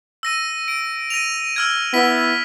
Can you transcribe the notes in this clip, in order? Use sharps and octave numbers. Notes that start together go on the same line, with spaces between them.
E6 A#6 D#7
D7
A#6 D#7 F7
E6 F6 G#6
B3 E4 B6